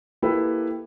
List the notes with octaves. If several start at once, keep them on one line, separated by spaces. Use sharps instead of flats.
A#3 E4 G4 A4 B4